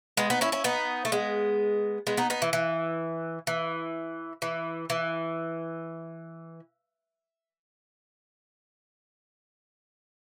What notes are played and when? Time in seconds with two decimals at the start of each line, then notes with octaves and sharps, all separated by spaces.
0.17 G#3 B3
0.30 B3 D#4
0.41 C#4 E4
0.52 C#4 E4
0.64 B3 D#4
1.05 A3
1.12 G#3 B3
2.07 G#3 B3
2.17 B3 D#4
2.30 B3 D#4
2.42 E3
2.53 E3
3.47 E3
4.42 E3
4.90 E3